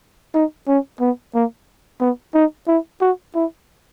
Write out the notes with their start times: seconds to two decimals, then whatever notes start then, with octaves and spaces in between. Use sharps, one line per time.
0.34 D#4
0.68 C#4
1.00 B3
1.35 A#3
2.01 B3
2.34 D#4
2.68 E4
3.01 F#4
3.35 E4